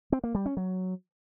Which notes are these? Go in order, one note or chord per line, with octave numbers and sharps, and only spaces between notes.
C4
A#3
G3
C#4
F#3